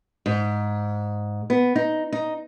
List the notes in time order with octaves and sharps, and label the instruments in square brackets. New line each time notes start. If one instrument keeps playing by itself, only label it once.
[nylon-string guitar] G#2
B3
D#4
D#4